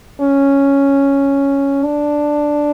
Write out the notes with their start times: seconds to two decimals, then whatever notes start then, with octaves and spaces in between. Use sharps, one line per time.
0.20 C#4
1.84 D4